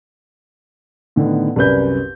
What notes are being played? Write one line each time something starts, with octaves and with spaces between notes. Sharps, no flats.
A2 D3 D#3 B3
C2 F#2 A#4 B4 D5 G6